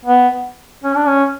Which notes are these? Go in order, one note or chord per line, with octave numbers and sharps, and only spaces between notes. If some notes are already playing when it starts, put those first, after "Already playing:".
B3
C#4
D4
C#4